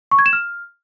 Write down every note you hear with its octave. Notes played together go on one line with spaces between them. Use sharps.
C#6
G#6
E7
F6